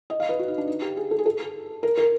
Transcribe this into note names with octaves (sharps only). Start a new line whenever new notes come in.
D#5
F5
B4
F#4
D#4
D4
D#4
G4
G#4
A4
G#4
A4
A#4
A#4